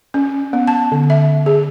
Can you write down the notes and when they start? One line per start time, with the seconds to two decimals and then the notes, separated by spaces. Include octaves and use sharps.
0.14 C#4
0.53 B3
0.67 A5
0.92 D3
1.10 E5
1.46 G#4